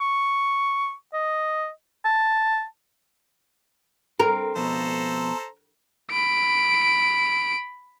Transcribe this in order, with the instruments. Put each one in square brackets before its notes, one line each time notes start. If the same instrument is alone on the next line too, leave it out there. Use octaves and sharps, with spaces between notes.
[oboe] C#6
D#5
A5
[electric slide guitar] C4 [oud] A#4
[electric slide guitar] F2 B2 [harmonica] A4 C5 A#5
[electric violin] B5 D7